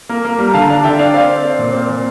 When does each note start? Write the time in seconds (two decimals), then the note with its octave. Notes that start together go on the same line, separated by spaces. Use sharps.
0.09 A#3
0.25 A#3
0.39 G3
0.48 A#5
0.54 D3 F5 A5
0.69 D4 F5 A5
0.84 D3 E5 G5
0.99 D4 D5 F5
1.14 C4 D5 F5
1.29 C4
1.44 C4
1.59 A#2
1.74 C4
1.89 A#2